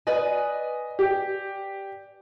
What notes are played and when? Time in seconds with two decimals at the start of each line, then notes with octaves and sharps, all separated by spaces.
0.07 B4 D5 D#5 G#5
0.99 G4